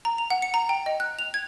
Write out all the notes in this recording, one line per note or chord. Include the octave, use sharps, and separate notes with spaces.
A#5
F7
F#5
C#7
A#5
G5
D#5
F#6
F7
G#6